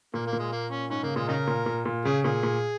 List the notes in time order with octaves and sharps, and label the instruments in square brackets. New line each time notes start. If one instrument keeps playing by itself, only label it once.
[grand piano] A#2 [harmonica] A#3
[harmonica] A#3
[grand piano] A#2
[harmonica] G#3
A#3
C#4
[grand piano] G#2 [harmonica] C#4
[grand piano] C#3 [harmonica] A#3
[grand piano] A#2 [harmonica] G#3
[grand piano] C#3 [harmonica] D#4 A#4
[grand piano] A#2
A#2
A#2
[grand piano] C#3 [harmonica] G#4
[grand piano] A#2 [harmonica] G#4
[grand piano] A#2